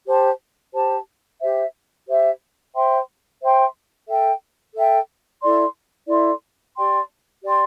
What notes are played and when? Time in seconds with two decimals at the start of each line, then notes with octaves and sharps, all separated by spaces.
0.06 G4 C5 A5
0.73 G4 C5 A5
1.40 G4 C5 E5
2.07 G4 C5 E5
2.74 C5 E5 G5 C6
3.41 C5 E5 G5 C6
4.07 A4 E5 G5
4.74 A4 E5 G5
5.42 E4 A4 D5 C6
6.08 E4 A4 D5 C6
6.75 G4 D5 G5 C6
7.42 G4 D5 G5 C6